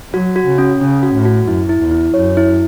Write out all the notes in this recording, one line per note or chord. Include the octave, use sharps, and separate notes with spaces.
F#3 F#4
F#4
C#3
C#4
C#3 C#4
F#4
A2
F#4
F#2 E4
E4
E2
E4
F#2 C#5
E4